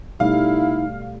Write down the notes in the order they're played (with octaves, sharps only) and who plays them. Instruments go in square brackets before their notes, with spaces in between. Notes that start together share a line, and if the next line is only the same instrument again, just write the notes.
[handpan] B2 G3 A3 [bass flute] D#4 [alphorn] E4 [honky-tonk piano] F5